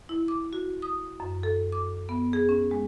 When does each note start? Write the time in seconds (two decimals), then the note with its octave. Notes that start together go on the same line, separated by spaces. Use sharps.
0.09 E4
0.28 D6
0.53 F#4
0.82 D#6
1.20 F#2
1.43 A4
1.72 D6
2.09 B3
2.33 G#4
2.49 C#4
2.71 G#3